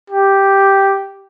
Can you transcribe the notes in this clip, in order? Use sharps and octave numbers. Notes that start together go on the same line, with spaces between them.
G4